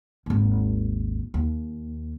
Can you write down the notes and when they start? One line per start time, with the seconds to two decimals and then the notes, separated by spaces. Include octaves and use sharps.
0.26 G#1 D#2
1.34 D#2